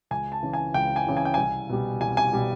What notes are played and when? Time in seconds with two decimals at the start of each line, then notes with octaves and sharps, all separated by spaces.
0.11 C#2 G#5
0.32 A5
0.43 C#3 E3
0.53 G#5
0.74 C#2 G5
0.96 G#5
1.06 C#3 E3
1.17 G#5
1.25 G5
1.34 C2 G#5
1.69 B2 G3
2.01 C2 G#5
2.17 G#5
2.33 B2 G3